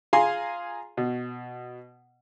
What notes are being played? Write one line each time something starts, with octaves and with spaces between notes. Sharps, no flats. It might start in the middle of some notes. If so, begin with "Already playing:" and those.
F4 G#4 F5 G#5 A#5 C6
B2